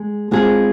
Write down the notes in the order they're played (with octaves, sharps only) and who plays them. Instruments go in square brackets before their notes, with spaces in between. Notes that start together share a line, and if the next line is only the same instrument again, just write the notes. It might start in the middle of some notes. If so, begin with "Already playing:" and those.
Already playing: [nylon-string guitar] G#3
G#3 C4 F4 G#4